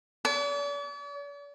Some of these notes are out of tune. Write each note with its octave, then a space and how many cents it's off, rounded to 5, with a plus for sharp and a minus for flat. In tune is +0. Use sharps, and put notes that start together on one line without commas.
D5 -45